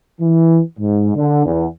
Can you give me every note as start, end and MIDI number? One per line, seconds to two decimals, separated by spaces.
0.21 0.60 52
0.79 1.14 44
1.15 1.45 50
1.46 1.66 40